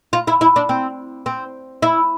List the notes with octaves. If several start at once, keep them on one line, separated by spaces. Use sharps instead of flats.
F4
E4
E4
D4
C4
C4
E4